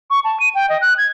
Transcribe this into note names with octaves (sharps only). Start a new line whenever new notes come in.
C#6
A5
D#7
G5
D#5
F#6
G#6